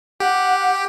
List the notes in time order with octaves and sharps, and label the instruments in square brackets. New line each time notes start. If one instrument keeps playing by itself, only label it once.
[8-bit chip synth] G4 [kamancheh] F#5